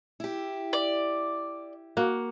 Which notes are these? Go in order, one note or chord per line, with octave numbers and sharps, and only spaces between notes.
E4 G4
D5
A#3 F#4